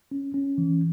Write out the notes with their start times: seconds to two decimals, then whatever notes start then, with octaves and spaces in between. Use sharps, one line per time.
0.11 C#4
0.34 C#4
0.58 E3